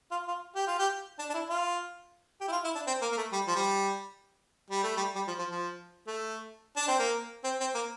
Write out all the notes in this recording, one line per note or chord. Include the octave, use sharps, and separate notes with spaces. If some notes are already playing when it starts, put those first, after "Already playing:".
F4
F4
G4
F4
G4
D4
D4
E4
F4
G4
E4
F4
E4
D4
C4
A#3
A#3
A3
G3
F3
G3
G3
A3
G3
G3
F3
F3
F3
A3
D4
C4
A#3
C4
C4
A#3